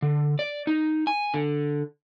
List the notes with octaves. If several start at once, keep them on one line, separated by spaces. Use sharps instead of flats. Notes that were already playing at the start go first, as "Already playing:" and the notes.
D3
D5
D#4
G#5
D3